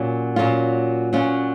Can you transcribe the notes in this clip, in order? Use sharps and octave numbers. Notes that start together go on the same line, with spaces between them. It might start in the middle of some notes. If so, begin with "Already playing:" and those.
Already playing: A#2 F#3 C#4 F4
A#2 F#3 C#4 F4
A#2 F#3 C#4 F4